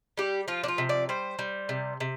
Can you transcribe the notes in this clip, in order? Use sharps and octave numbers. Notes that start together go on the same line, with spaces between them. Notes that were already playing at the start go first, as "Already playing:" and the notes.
G3 G4
F3 F4
D4
F4
C3
D5
G3 C5
G3
C3
C3